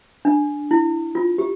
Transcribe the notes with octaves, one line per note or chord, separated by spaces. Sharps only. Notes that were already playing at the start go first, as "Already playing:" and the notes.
D4
E4
F4
G4